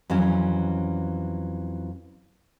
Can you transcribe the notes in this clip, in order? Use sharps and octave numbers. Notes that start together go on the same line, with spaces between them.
F2 E3 F#3 C#4